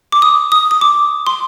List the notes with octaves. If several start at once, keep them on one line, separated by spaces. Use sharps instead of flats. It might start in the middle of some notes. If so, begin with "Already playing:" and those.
D6
D#6
D#6
D#6
D6
C6